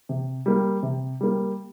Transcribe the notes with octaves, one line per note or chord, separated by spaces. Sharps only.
C3
G3 A#3
C3
G3 A#3